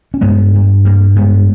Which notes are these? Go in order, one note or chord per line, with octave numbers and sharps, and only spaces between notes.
C#4
G2 G#3 B3
G2
G2 G3 A#3
G2 G#3 B3